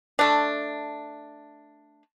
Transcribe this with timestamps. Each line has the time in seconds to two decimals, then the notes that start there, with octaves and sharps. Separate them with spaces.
0.19 A3 D4